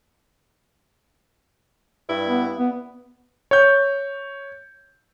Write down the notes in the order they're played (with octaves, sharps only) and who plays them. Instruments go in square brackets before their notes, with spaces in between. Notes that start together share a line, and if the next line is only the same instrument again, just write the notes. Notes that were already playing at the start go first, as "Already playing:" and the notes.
[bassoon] G2 [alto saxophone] E4
[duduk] B3
B3
[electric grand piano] C#5 G6